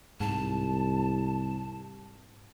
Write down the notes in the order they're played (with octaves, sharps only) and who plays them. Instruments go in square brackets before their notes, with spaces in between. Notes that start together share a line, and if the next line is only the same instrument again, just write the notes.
[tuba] C2 [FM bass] G#2 [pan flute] A5